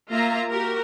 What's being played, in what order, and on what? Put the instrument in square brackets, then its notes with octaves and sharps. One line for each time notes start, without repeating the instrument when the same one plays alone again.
[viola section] A#3 F4 E5 A#5
F#4 G4 A#4